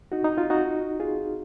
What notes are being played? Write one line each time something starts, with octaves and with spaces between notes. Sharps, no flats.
D#4 F#4
D#4
F4
D#4 F#4
F4 G#4